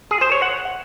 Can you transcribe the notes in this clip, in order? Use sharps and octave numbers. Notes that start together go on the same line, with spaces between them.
G#4
C5
C#5
F#5